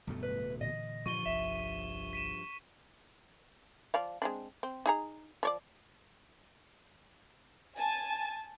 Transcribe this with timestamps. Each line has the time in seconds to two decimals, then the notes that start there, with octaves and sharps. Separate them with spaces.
0.07 D1 G2 B2 A3
0.23 B4
0.61 A#2 D3 E3 D#5
1.06 G2 F3 C#6 D#7 G7
1.26 G1 C2 E5 E7
2.13 B6 D#7 E7
3.94 F3 D5 F5
4.22 G#3 C4 D4
4.63 C4
4.86 D#4 G#4 A#5
5.43 F3 C#5 D5
7.78 G#5 A5